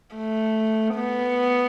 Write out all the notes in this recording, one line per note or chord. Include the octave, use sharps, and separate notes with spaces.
A3
B3